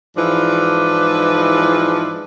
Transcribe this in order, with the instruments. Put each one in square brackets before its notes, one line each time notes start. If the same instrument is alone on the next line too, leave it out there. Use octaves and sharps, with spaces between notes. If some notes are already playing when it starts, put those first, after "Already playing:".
[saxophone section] G#2 E3 F3 D4 E4 B4